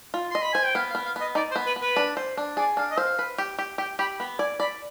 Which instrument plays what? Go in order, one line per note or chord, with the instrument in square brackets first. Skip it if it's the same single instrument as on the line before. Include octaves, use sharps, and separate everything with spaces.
[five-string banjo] F4
[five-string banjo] D#5 [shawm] C6
[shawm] B5
[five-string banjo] C5 [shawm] G#5
[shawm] G5
[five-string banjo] B3 [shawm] F5
[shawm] F5
[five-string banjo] B3
[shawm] F5
[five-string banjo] B3 [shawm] D#5
[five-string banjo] D#4 [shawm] D5
[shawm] C5
[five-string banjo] B3
[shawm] B4
[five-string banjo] B3
[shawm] B4
[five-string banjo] D4
C5
D4
[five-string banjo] G#4 [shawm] D5
[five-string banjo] D4 [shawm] F5
[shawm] D#5
[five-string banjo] C5 [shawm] F5
[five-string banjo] B4
G4
G4
[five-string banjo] G4 [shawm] G5
[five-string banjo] G4 [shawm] B5
[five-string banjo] B3 [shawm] B5
[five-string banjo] D5 [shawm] G#5
[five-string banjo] D5 [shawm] B5